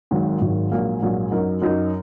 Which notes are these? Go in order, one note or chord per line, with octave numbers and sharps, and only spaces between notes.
G#1 G#2 D#3 F#3
G#1 G#2 D#3 F#3
A#1 G#2 F#3 A#3
A#1 G#2 F#3 A#3
F#2 F#3 D#4 A#4
F#2 F#3 D#4 A#4